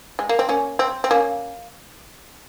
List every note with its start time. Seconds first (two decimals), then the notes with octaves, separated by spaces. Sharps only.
0.19 G#3
0.29 A#3
0.39 C4
0.49 A#3 C#4
0.79 C4
1.04 C4
1.11 A#3 C#4